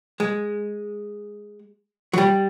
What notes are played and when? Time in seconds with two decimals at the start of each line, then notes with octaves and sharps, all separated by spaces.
0.20 G#3
2.13 F#3
2.18 G3